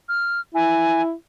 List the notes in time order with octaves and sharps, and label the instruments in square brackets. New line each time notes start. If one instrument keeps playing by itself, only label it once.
[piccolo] F6
[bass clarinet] E4 [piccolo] G#5